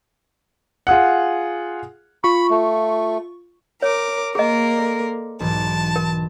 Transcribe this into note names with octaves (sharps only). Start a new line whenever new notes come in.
F4 G#4 F#5
F4 B5 C#6
A3
A#4 C#5 D6
A#3 G#4 A#4 C5 D#5 E7
A4 C5 D5
B1 G#2 E3 A5
A#4